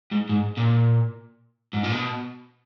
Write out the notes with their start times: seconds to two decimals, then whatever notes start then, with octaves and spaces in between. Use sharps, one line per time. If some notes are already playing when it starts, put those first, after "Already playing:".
0.11 G#2
0.29 G#2
0.58 A#2
1.74 G#2
1.84 A#2
1.93 B2